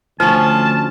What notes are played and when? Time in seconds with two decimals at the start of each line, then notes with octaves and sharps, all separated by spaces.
0.20 D2 F3 C#4 A5 F6